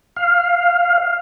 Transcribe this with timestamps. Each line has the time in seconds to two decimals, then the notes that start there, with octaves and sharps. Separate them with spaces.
0.16 F5